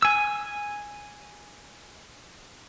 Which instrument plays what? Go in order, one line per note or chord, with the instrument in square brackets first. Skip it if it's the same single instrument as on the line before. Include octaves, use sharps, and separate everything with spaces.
[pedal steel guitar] G#5 E6